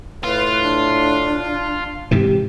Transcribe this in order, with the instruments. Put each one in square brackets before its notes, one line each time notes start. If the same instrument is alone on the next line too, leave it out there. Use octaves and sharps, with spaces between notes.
[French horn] A2 [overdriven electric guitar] F4 [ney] B4
[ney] D4
[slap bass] G#2 C3 E3 [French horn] G4